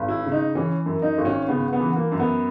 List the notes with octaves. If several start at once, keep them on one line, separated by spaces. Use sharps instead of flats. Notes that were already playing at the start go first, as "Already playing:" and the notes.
Already playing: G#1
E4
C#3
D#4
E3 C#4
F#2
D#4
G#1
C#4
C#3 B3
B3
E3
A#3
F#2
B3